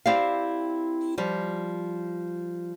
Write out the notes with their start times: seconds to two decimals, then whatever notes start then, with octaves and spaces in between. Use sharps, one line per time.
0.06 C4 E4 G4 D5 F5
1.18 F3 G3